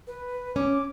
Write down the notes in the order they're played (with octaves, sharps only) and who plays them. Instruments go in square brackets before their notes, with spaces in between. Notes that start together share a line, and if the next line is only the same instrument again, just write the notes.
[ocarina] B4
[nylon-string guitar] C#4 [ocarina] D6